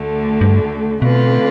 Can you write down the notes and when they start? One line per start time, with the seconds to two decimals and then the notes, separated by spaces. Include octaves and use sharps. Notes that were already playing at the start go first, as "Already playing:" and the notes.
Already playing: D2 D3 A3
0.41 G2
1.02 B2 D3 A3 C4 F4 B4